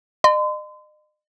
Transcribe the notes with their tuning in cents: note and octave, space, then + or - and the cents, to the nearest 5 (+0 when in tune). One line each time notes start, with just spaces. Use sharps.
D#5 -40 C6 -35